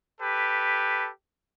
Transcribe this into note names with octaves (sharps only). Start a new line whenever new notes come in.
G4 A4 B4